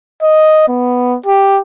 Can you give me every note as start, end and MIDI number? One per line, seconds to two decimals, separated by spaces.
0.23 0.64 75
0.68 1.18 59
1.26 1.60 67